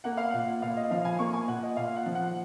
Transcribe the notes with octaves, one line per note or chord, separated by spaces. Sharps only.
A#3 F#5
F5
A#2 F#5
A#2 F5
D#5
F3 F5
G#5
A#3 C#6
G#5
A#2 F#5
D#5
A#2 F5
F#5
F3
F#5